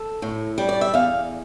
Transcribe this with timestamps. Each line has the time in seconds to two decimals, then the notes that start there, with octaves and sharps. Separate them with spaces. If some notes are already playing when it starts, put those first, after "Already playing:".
Already playing: A4
0.22 A2
0.58 G3
0.69 D5
0.81 E5
0.94 E2 F5